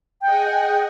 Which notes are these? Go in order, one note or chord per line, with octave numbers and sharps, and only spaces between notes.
G#4 D#5 F#5 G5